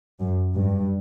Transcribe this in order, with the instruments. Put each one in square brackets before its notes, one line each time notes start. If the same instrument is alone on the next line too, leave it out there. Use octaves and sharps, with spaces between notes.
[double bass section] F#2
G2